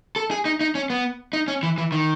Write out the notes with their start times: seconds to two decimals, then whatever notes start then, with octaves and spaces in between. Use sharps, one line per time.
0.16 A4
0.31 G#4
0.45 D#4
0.61 D#4
0.75 C#4
0.90 B3
1.33 D#4
1.48 C#4
1.63 E3
1.78 E3
1.92 D#3